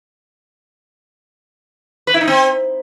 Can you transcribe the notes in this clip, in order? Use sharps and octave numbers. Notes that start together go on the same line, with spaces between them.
B4
E4
D#4
C4